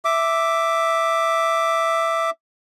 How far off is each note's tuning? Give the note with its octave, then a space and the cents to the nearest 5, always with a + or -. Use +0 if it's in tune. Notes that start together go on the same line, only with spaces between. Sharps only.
E5 +0 D6 +0